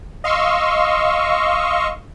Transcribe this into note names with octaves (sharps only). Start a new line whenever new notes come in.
D#5 F5 C6 C#6 E6